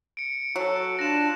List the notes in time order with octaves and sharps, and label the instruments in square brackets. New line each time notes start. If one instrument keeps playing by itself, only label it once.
[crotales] C#7 D7
[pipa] F#3 [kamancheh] F#4 A4
[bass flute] D4 [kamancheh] F4 F#6 [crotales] A#6 E7